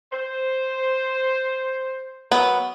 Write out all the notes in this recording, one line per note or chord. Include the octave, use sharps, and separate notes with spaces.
C5
F#3 B3 A#4 B5